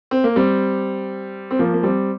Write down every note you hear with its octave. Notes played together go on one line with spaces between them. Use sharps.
C4
A#3
G3 C4
C4
F3 A#3
A#3
G3 C4